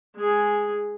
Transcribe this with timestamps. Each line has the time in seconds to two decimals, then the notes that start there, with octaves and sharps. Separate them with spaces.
0.16 G#3 G#4